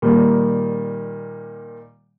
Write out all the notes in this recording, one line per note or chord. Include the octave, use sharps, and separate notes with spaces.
A#2 D#3 G3